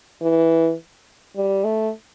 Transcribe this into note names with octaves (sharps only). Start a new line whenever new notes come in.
E3
G3
A3